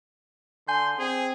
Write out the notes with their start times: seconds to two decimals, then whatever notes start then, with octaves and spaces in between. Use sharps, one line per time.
0.68 D3 G#5 C6 G6
0.99 C4 G#4